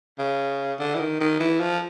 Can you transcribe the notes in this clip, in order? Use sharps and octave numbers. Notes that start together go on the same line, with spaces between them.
C#3
D3
E3
D#3
D#3
E3
F3